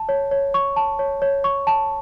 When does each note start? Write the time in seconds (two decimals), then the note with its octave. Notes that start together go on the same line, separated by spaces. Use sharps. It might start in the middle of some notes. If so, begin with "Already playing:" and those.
Already playing: A5
0.09 C#5
0.31 C#5
0.54 C#6
0.76 A5
0.99 C#5
1.22 C#5
1.44 C#6
1.67 A5